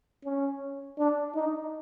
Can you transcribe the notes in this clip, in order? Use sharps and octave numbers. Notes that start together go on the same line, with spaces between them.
C#4
D4
D#4